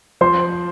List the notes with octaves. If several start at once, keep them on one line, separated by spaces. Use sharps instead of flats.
F3 C5 C6